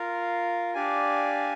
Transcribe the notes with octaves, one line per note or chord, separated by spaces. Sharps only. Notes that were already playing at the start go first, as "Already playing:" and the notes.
Already playing: F4 A#4 F5
D4 G4 D5 F5 G#5